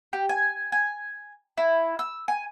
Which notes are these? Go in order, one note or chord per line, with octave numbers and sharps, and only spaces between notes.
G4
G#5
G#5
E4
E6
G#5